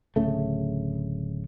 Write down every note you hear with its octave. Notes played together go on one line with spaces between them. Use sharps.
D1 C#3 A3